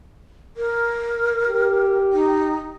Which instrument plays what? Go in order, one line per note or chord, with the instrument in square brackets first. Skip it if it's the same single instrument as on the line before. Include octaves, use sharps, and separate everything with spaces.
[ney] A#4
[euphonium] G4
[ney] D#4